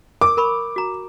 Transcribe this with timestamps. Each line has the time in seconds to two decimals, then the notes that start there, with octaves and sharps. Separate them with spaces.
0.21 A#4 D6
0.37 A#4 B5 C#6
0.76 F#4 A#5